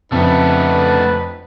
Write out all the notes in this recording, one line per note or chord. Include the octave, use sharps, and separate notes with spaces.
F2 C#3 A3 B3 D4 D#4 B4